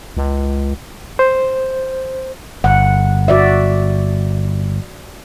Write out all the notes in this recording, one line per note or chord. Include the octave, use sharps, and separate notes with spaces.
C#2
C5
G1 F#5
F#4 D5 E5